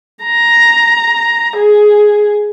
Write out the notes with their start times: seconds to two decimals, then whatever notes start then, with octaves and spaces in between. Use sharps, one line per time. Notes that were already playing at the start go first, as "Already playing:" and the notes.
0.24 A#5
1.57 G#4